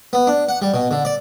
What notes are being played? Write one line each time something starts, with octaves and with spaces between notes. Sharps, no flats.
B3
D4
F#5
G3
B2
D3
D5